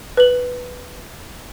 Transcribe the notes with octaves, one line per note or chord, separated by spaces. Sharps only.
B4 F#7